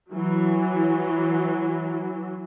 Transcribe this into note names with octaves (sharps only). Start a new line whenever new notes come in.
E3 F#3